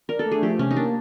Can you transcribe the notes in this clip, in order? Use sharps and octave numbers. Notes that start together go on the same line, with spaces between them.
D4 A#4
A4
A3
G#4
F3 G4
C3 C#4
D#4
A#3 D4